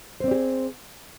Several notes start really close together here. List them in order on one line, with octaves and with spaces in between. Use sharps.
C5 C4 D5 G4 G#4